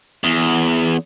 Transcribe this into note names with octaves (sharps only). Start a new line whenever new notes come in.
E2